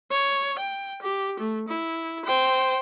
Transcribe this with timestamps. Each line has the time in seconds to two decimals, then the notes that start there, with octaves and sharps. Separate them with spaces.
0.12 C#5
0.59 G5
1.02 G4
1.39 A3
1.68 E4
2.25 C5 G5